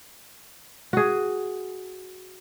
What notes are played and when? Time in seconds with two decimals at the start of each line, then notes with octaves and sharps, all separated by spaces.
0.93 F#4 G#4